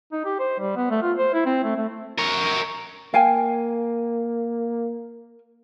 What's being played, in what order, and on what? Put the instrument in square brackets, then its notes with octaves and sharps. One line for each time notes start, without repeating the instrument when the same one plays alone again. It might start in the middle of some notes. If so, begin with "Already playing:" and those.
[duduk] D#4
G4
C5
G3
B3
A3
F4
C5
E4
C4
A3
A3
[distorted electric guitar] A#4 C#5
[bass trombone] A#3 [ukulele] F5 G5 G#5